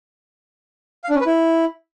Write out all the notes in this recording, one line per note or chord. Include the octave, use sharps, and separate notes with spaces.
F5
D4
C#4
B4
E4